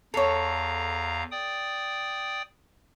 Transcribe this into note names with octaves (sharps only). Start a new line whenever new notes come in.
E2 A4 C#5 F5 A#5
D5 G5 D#6